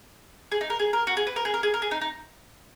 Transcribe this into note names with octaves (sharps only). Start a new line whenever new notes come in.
G#4
D#4
A#4
G#4
A#4
F#4
G#4
B4
A#4
G#4
A#4
G#4
A#4
G#4
D#4
D#4